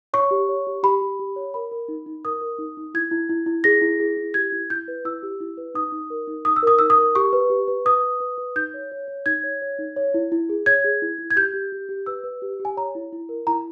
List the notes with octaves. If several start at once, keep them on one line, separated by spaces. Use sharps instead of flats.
C#5 C#6
G4
C#5
G4
G4 B5
G4
G4
C#5
A#4 B5
A#4
D#4
D#4
A#4 D#6
A#4
D#4
D#4
E4 G#6
E4
E4
E4
G#4 A#6
E4
G#4
E4
G4 G#6
E4
E4 G6
B4
E4 E6
G4
E4
B4
D#4 D#6
D#4
A#4
D#4
D#4 D#6
E6
A#4 D#6
D#4 E6
D#6
A#4
G4 C#6
B4
G4
B4
B4 D#6
B4
B4
B4
D#4 G6
C#5
C#5
C#5
D#4 G#6
C#5
C#5
D#4
C#5
E4
E4
G#4
C#5 G#6
G#4
E4
E4
G#6
G4 G6
G4
G4
G4
B4 E6
B4
G4
G4
G#5
C#5 A#5
E4
E4
A#4
E4 A#5